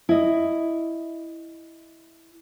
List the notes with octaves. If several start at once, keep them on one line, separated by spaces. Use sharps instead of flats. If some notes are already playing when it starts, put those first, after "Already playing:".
E4 D#5